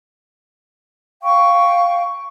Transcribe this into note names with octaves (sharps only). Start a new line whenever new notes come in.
F5 G5 C#6